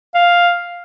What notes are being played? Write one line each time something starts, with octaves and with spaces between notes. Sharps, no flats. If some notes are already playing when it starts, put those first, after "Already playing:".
F5